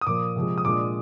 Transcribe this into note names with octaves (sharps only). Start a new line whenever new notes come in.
D#6
A#2 F3 A#3 D6
C3 F3 G#3
D#6
A#2 G#3 D4 F4 D6